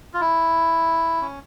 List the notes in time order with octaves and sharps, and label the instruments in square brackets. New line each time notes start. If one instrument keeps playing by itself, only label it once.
[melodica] F4
E4
C#4